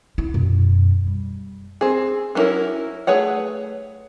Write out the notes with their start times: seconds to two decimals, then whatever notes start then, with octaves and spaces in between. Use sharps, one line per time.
0.18 E4
0.34 F#2 B2
1.06 G3
1.81 C4 G#4
2.35 F#3 B3 C#4 E4 A#4
3.07 A3 G#4 B4 C#5 F#5